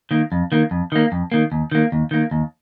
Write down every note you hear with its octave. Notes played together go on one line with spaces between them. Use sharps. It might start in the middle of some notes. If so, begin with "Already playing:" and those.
D#3 A#3
F2
D#3 A#3
F2
D#3 A#3
F2
D#3 A#3
D#2
D#3 A#3
D#2
D#3 A#3
D#2